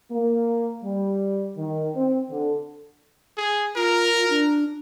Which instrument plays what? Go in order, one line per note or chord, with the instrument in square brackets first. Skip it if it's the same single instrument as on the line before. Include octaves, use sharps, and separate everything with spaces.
[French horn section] A#3
G3
D#3
C4
D3
[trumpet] G#4
[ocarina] F4 [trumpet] A#4
[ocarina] D4